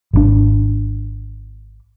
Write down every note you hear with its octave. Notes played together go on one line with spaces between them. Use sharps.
G#1 D#3 D4